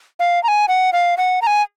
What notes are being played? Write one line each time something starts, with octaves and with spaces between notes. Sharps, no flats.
F5
A#5
G#5
F#5
F5
F#5
A#5
G#5